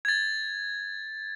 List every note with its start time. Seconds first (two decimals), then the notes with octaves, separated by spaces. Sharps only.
0.05 G#6 A6